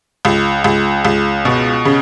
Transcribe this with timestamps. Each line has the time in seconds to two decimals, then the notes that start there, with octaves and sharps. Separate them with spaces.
0.25 C#2
0.64 C#2
1.05 C#2
1.45 B2
1.85 C#3